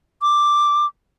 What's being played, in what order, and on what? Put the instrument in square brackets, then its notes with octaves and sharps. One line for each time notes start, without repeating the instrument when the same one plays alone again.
[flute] D6